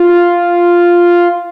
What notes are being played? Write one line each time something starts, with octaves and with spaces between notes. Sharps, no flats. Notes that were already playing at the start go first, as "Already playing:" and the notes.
Already playing: F4